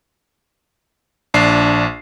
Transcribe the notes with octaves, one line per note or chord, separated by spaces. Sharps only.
A#1 D4 C7